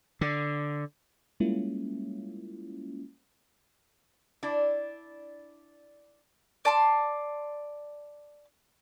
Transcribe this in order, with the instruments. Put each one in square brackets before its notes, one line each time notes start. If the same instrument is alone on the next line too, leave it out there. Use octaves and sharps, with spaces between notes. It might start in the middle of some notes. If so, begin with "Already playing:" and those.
[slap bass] D3
[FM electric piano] G3 G#3 A#3 C#4 E4 F4
[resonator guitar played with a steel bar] D4 E4 D5
[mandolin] D5 A5 C6